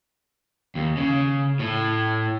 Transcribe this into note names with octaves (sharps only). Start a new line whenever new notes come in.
D#2
C#3
A2